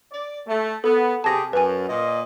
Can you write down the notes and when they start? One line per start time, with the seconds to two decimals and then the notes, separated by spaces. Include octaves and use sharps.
0.12 D5
0.47 A3
0.84 B3 A4
1.24 C3 G4 G#4 A5 A#6
1.53 F#2 B4 G#5
1.89 A#2 D#5